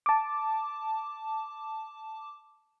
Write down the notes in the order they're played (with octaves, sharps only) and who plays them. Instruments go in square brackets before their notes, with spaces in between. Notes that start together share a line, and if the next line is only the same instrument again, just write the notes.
[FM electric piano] A5 D6